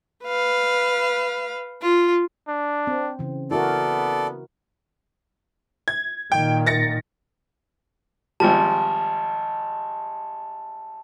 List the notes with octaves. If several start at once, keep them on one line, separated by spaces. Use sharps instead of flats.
B4 F5
F4
D4
C4
C#3 E3
B3 E4 F#4 A4 A#4 D5
G#6
A#2 D#3 G5
A6 A#6 C#7
G#1 F3 G3 A5